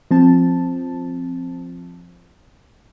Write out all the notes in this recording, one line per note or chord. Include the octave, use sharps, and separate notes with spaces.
F3 C4 A5